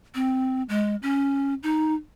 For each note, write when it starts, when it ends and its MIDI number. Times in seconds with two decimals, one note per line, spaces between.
0.15 0.63 60
0.69 0.96 56
1.03 1.54 61
1.63 1.94 63